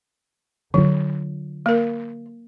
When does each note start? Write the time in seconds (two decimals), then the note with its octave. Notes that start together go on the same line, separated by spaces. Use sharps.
0.74 D3 F#3 F4
1.66 A#3 A#4